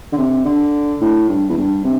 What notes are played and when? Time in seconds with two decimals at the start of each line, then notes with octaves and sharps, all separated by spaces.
0.12 D3
0.18 C3
0.45 D3
1.01 A2
1.29 G2
1.49 E2
1.57 G2
1.84 C3